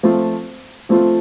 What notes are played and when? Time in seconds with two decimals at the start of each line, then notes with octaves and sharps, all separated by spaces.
0.03 F3 A3 C4 F4
0.89 F3 A3 C4 F4